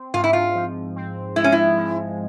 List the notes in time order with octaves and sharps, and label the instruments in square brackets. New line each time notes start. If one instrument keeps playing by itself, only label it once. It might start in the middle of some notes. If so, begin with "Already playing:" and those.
Already playing: [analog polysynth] C4
[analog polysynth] G#2 [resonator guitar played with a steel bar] F4
[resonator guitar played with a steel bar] E4
F4
[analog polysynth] F3
C4
[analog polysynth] G#3 [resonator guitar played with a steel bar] E4
[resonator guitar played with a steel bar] C#4
E4
[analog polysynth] F3